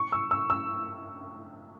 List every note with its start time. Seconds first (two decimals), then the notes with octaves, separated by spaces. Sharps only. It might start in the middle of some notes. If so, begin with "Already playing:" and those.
Already playing: C#6
0.12 E6
0.31 E6
0.50 E6